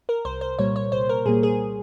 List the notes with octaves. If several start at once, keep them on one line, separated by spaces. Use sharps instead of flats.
A#4
C2 C5
C5
A#2 G3 A#3 C#5
C#5
C2 C5
A#4
A#2 G3 A#3 G#4
G#4